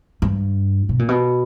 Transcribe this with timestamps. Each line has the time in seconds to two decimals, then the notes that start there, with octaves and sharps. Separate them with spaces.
0.22 G2
0.89 B2
0.99 A#2
1.09 B2